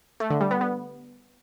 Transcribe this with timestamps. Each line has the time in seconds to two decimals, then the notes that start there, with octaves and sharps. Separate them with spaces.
0.20 A3
0.30 D3
0.41 G3
0.51 B3
0.61 B3